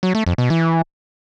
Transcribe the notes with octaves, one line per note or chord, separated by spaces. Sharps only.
F#3
A3
F2
B2
E3